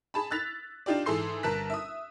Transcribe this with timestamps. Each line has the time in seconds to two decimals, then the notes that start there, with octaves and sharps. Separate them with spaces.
0.14 G#4 A5 B5
0.31 E6 F#6 A6 B6 F7
0.86 D4 D#4 F4 G4 D5
1.06 G#2 E3 G#4 A4 C6 C7
1.43 G1 A#4 A5 F#6 B6
1.70 E5 D#6